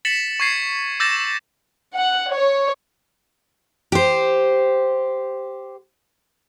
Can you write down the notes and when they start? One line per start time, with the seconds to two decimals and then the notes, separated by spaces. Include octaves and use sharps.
0.05 A6 B6 C#7 E7 F#7
0.40 C#6 G#6 C7 C#7
1.00 D6 E6 G6 A6 A#6 E7
1.94 F#5
2.31 C#5
3.92 G4 C5